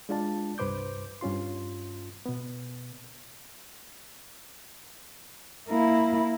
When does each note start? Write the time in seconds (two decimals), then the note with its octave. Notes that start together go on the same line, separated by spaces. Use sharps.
0.09 G#3 D4 F4 D5 A5
0.58 C2 G2 B4 C5 D6 G6
1.21 G2 C#4 F4 C6
2.26 B2 B3
5.69 A#3 E4